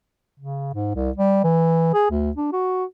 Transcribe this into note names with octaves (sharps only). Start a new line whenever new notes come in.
C#3
G#2
C2
G3
E3
G#4
D2
D4
F#4